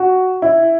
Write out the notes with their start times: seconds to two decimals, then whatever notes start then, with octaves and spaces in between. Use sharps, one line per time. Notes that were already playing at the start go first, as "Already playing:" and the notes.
Already playing: F#4
0.42 E4